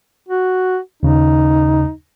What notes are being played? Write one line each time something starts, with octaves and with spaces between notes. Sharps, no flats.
F#4
D#2 C#3 D#4